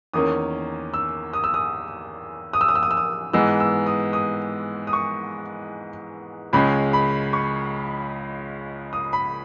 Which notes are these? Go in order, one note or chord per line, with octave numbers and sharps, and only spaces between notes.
E2 D#3 A#3 C#4 D#6
E6
D#6
E6
D#6
D#6
E6
D#6
E6
D#6
E6
D#6
G#2 E3 G#3 B3 E6
E6
D#6
D#6
D#6
C#6
C#2 C#3 G#3 C#4 B5
B5
C#6
D#6
B5